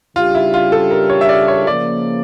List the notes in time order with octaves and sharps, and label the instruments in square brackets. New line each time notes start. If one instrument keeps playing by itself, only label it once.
[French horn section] C#3 G3 D4 G4 [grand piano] F4
[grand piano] E4
F4
A4
A#4
C#5
E5
D5
C#5
[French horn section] C#3 F3 A#3 [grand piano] D5